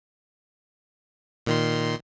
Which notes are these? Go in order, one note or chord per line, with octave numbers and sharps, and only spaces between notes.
A#2 D#3 C6